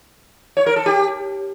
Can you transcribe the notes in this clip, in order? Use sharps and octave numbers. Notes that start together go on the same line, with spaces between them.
C#5
A#4
A4
G4